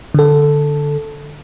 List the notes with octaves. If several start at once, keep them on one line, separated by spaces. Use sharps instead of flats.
D3 A4